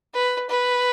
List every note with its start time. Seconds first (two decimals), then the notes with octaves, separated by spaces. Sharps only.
0.14 B4
0.49 B4